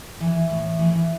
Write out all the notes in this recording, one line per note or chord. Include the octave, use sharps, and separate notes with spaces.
E3
A2
E3